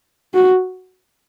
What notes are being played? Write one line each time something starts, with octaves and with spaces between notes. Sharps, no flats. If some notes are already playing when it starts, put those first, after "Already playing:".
F#4